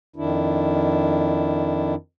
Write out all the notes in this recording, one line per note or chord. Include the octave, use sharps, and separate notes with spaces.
F2 D#3 D4 E4